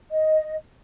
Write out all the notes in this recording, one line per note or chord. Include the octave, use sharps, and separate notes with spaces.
D#5